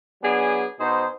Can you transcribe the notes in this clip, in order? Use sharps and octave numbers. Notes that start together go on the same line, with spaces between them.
F#3 B3 D4 G#4 G#5 B5
B2 D#4 G#4 C5